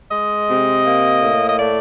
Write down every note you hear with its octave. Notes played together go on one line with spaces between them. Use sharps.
G#3 D#5
C3
A#3
A2
D#5
A3 D5